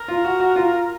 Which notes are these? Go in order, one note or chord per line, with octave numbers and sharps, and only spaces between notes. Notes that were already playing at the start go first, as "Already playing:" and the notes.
Already playing: A#4
F4
F#4
F#4
F4